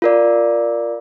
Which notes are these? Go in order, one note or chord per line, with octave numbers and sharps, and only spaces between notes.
F4 A#4 D5